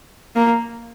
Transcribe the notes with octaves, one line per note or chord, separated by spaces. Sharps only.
A#3